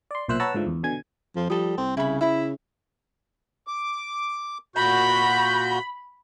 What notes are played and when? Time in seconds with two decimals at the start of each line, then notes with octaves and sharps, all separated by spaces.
0.11 D5 C6
0.28 B1 A#2 C5 E5 E6 F#6
0.40 B4 C#5 F#5 A5 A#5 E6
0.55 G#2 D3 F3 A3
0.67 E2
0.83 B2 D3 G#5 G#6
1.36 F2 F3
1.50 F3 G3 A4 D#6
1.77 C2 C4
1.97 C#3 E4 B5
2.21 C#3 E4 E5 B5
3.67 D6
4.76 A#2 F#4 B5 G6